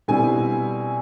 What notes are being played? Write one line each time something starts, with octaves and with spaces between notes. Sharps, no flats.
B2 G3 C4 E4 G#5